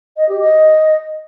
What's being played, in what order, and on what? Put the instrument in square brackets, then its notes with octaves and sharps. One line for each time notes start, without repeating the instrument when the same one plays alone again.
[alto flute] D#5
G4
D#5